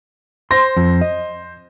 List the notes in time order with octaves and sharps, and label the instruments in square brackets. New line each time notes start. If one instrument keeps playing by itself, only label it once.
[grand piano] C5 A#6 [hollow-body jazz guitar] C6
[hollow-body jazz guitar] F2
D#5